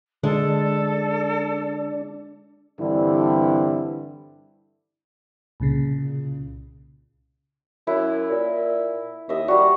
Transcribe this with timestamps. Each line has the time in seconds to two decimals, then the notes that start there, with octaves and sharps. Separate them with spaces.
0.23 D3 G#3 D4 A4
2.80 G2 D3 E3 G3 C4 E4
5.60 C2 A#2 C#3
7.87 F#2 E4
8.31 A#2
9.29 D#2 D#5 E5
9.48 G3 D4 F#4